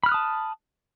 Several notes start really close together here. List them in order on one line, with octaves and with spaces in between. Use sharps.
B5 F6 F#6 D#6 A5